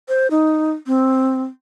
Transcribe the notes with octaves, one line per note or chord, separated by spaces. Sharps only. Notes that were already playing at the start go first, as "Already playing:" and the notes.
C5
D#4
C4